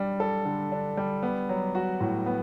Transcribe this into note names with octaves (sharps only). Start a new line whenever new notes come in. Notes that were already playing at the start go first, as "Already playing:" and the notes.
Already playing: G3 D4
A4
D3
D4
G3
B3
F#3
F#4
A2
B3